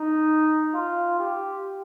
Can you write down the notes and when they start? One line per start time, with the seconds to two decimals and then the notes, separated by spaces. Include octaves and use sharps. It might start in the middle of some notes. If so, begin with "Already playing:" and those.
Already playing: D#4
0.74 F4
1.19 G4